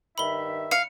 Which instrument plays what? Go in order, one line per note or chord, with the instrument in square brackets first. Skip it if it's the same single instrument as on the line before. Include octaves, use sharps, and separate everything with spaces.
[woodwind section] G2 D#3 E5 [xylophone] B5 G7
[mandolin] F5 [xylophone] C#7